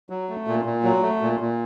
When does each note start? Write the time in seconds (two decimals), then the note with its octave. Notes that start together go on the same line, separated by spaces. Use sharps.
0.10 F#3
0.29 A3
0.47 A#2
0.65 A#2
0.84 F#3
1.02 A3
1.21 A#2
1.40 A#2